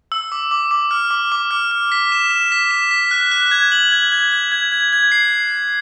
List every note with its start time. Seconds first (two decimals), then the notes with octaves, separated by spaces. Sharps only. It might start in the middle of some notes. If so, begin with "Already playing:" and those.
0.12 E6
0.32 D6
0.51 D6
0.71 D6
0.91 F6
1.11 D6
1.32 D6
1.51 F6
1.71 F6
1.92 B6
2.12 E7
2.31 E7
2.52 B6
2.71 E7
2.91 B6
3.11 F#6
3.31 F#6
3.51 G#6
3.72 F#7
3.92 G#6
4.12 G#6
4.32 G#6
4.52 G#6
4.72 G#6
4.93 G#6
5.12 C7